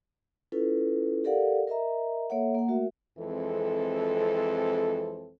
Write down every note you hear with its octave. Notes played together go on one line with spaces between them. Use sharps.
C#4 E4 F4 A4 B4
G4 A4 A#4 D5 F5 F#5
A#4 D#5 E5 A#5
A#3 A4 C#5 E5 F#5
A#3 F#5
A3 F#4 A#4 E5
F2 E3 G#3 C4 A4